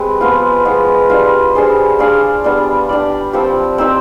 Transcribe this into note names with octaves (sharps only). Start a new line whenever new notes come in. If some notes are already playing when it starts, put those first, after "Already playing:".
Already playing: G#3 C4 G4 B4
F3 B3 F4
F3 G#3 B3
G3 D4 F4
G3 D4 G#4 C5
D4 G#4 D5 F5
G3 B3 D4
D4 G4 D5
F3 C4 G4
C4 D#4 G4